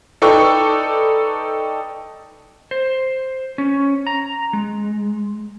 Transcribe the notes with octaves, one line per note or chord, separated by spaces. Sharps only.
D#4 A4 B4 D5 G5 C#6
C5
C#4
A#5
G#3